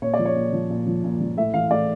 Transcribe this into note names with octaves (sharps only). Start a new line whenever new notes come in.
A#2 C#5
D5
F3
C#5
A#2
F3
A#2
F3
A#2
F3
A2 E5
E3 F5
A2 D5